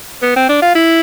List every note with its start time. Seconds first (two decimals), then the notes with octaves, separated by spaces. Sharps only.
0.22 B3
0.36 C4
0.49 D4
0.62 F4
0.75 E4